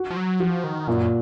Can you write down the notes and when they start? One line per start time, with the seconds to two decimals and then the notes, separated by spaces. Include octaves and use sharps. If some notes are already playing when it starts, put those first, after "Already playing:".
Already playing: F#4
0.10 F3
0.16 F#3
0.40 F3 F#4
0.64 D#3
0.88 F#2 A#2